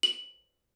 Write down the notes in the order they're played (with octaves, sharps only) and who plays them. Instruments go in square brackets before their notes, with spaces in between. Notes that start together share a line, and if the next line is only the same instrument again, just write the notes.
[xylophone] F#7